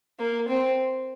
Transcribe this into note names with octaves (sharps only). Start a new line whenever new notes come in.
A#3
C4